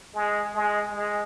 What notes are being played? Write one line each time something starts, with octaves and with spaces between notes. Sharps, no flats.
G#3
G#3
G#3